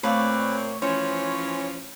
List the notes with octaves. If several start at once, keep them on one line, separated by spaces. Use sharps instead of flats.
A#2 A3 A#3 C4 B4 C#5 D5 F5
E3 F3 C#4 C5 C#5